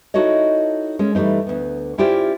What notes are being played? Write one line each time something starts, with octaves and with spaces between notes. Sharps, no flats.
D#4 E4 F#4 A4 C#5 D#5
G#3 A#3 C#4
E3 G3 A3 C4 D#4
D2 B3
C#4 E4 F4 G4 C5 D5